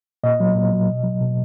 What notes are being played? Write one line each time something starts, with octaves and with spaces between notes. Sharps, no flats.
A#2 D#5
F#3
A#2
F#3
B2
F#3
B2